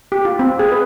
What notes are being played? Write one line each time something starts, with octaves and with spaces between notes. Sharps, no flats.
G4
F4
C4
G#4
B4